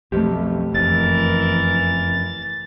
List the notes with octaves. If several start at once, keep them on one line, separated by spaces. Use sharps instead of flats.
B1 F2 A3 G4
F#1 F2 E3 A#4 A6